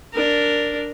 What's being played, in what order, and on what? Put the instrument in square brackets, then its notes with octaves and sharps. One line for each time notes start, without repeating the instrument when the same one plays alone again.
[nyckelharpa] D4 A#4